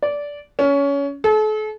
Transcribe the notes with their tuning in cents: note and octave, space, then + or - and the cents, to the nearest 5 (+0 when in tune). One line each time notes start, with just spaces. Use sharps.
D5 -15
C#4 +20
A4 -40